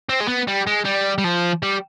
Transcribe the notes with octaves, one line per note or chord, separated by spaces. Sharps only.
C4
G#3
B3
G3
G#3
G3
G3
F3
G3